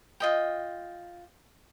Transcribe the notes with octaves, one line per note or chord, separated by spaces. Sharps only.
F4 D#5 G5